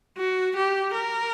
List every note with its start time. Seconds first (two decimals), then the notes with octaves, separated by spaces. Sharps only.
0.17 F#4
0.56 G4
0.94 A#4